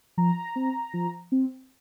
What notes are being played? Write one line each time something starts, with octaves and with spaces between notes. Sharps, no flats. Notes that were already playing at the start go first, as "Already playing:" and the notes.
F3 A#5
C4
F3
C4